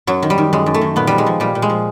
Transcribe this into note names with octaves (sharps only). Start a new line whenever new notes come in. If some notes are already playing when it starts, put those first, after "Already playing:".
F#2 F#3
D#3
G3
D#3
F#2 G#3
F#2
A3
D#3
A#2 B3
F3 G3
G#3
F3
A#2 G3
A#2
G#3
F3